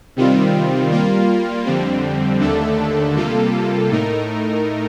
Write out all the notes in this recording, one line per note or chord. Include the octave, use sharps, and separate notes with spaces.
C3 D#3 G3 C4 F4
G3 A#3 F4
F2 D3 G3 C4
D#2 D3 A3 D4 A4
C3 G3 A#3 F4 A4
A2 A3 D#4 A#4